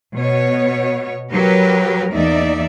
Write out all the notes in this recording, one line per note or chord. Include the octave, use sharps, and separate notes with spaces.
B2 B3 C#5
F#3 G4 A#4 B4
E2 A#3 D#4 D5 E5